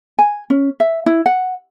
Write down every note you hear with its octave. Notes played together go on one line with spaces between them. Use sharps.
G#5
C#4
E5
E4
F#5